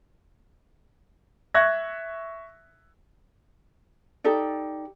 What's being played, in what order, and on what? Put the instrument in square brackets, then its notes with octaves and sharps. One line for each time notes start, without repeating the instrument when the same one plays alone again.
[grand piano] E5 C#6 F#6 G#6 A#6
[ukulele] D#4 G4 A4 D5